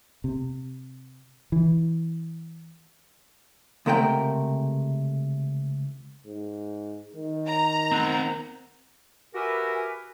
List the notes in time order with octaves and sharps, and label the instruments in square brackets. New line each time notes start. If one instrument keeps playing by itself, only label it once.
[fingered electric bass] C3
E3
[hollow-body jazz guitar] C#2 C3 A3 A#4 F#5 G5
[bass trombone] G#2
D#3
[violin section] A#5
[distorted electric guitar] C4 F#5
[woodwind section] F#4 G4 A#4 B4 E5 G#5